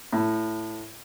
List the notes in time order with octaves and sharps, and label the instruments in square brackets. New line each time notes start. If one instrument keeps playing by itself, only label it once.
[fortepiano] A2